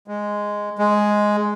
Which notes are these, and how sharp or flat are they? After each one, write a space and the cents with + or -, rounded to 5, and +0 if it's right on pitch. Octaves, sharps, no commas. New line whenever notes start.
G#3 -5
G#3 +5